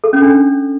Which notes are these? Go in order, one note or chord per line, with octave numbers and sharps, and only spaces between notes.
A4
C#4
D4